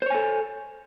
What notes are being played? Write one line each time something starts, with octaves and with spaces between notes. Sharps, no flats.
A4 C5 C#5 G#5